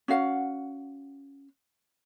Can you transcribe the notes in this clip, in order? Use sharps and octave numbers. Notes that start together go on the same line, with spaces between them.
C#4 F#4 F5 F#5